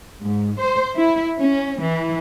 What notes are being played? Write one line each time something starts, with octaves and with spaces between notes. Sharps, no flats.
G#2
C5
E4
C#4
E3